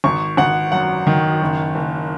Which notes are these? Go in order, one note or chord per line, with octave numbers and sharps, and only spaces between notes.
G#1 C#6
G#1 F#5
F#2 F#5
D#3
F#1
F#1